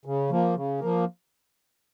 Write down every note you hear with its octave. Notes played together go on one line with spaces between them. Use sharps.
C#3
F3 A#3
C#3
F3 A#3